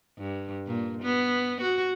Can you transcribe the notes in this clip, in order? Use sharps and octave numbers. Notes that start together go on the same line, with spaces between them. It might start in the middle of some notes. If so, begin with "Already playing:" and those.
G2
A#2
B3
F#4